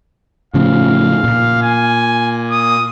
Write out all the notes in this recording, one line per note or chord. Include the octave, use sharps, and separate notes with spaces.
A2 C#3 F3 F5
A#2
G#5
D#6